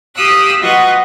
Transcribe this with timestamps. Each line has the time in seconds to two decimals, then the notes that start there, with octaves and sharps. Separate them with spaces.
0.14 G4 F5 D#6 E6 F#6
0.61 F#3 F4 B4 D#5 F#5 C#6